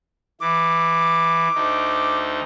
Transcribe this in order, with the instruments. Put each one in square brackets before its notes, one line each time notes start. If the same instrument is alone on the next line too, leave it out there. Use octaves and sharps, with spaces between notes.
[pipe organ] E3 [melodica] D6
[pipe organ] D2 D#4